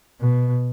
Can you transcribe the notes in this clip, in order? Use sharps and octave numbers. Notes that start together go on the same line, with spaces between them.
B2